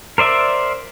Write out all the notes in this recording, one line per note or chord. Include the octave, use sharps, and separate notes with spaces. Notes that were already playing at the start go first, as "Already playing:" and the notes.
A#4 C5 D5 E5